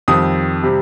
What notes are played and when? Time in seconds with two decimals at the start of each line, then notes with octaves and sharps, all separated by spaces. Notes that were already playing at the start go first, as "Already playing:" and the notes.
0.08 F2 D#3 G3 D#6
0.63 C3 G3